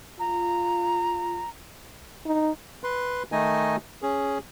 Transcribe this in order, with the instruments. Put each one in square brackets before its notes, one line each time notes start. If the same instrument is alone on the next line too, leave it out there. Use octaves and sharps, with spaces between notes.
[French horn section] F4 [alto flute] A#5
[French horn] D#4
[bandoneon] B4 C6
D#3 A3 D#4 D#5 G#5
C#4 G#4